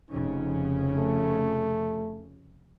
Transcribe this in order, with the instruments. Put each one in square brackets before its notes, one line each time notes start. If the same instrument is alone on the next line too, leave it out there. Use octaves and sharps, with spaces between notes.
[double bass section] F1 C#3 C#4 [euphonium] D#4
[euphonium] A3